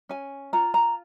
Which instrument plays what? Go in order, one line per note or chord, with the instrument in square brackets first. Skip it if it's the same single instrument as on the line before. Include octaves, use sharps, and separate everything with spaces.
[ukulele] C#4 G#5
F4 A#5
A#5